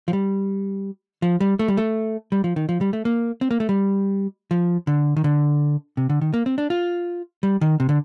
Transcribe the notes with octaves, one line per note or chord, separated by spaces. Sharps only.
F3
G3
F3
G3
A3
G3
A3
G3
F3
D#3
F3
G3
A3
A#3
C4
A#3
A3
G3
F3
D3
D#3
D3
C3
D3
D#3
A#3
C4
D4
F4
G3
D#3
C3
D3